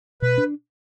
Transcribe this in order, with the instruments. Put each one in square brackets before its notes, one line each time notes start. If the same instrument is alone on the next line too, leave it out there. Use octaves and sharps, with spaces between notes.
[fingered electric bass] B2 [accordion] B4
[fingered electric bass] D4